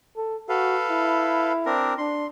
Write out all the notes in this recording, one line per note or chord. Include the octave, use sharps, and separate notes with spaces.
A4
F#4 A4 B4 F5
E4
C4 D4 A#4
D4 C6